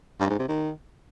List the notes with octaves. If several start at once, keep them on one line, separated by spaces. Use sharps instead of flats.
G2
G#2
C3
D#3